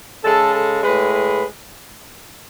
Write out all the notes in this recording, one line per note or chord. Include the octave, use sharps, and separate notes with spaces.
C#3 G#3 A4
A4
A2 G#3 B4
B4